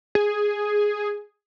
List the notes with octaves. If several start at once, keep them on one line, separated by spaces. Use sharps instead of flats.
G#4